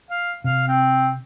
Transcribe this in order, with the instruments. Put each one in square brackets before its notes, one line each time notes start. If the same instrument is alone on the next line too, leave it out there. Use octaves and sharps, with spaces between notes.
[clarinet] F5
[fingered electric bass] C3 [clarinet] F5
[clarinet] C4